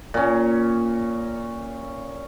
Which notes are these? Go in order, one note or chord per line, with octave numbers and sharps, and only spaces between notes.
A#2 C#4